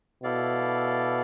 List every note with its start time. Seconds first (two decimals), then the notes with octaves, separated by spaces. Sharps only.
0.23 B2 E4 A4 D5 F5